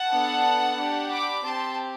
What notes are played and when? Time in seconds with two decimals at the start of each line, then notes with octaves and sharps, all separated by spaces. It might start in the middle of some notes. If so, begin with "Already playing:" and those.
Already playing: F#5 A5
0.10 B3 D4 A4
0.77 D4 G4
1.10 B5 D6
1.44 C4 G4 A5 C6